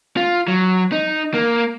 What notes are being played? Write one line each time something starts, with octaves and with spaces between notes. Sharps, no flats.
F4
F#3
D#4
A#3